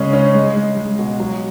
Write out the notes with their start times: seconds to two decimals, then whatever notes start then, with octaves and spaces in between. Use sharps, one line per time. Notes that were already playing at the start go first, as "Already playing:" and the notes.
Already playing: C#3 G#3 C#4
0.13 C#4
0.34 G#3
0.56 G#3
0.77 G#3
0.99 B2
1.20 F#3